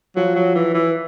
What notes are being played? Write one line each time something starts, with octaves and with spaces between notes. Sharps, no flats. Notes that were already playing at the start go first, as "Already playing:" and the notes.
F3 F#3
F#3
E3
E3